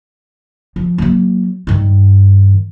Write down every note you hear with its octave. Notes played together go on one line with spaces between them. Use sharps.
F3
F#3 A#3
G2 D#3